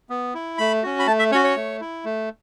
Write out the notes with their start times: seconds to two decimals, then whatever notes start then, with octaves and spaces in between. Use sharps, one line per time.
0.09 B3
0.34 E4
0.58 A3 B5
0.83 C#4 F#4
0.99 B5
1.07 A3 A5
1.19 E5
1.31 C#4 C#5
1.34 F#4
1.44 C#5
1.56 A3
1.81 E4
2.05 A3